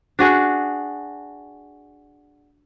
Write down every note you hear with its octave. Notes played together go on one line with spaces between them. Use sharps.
D4 F#4 G#4